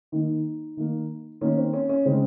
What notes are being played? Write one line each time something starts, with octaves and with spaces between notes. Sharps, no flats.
D#3 A#3 D#4
D#3 A#3
D#3 A#3 C#4
C4
C#4
C#4
C#3 G#3 C4